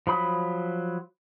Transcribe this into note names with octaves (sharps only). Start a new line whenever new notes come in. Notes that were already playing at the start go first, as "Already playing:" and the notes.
F3 F#3 B5 D#6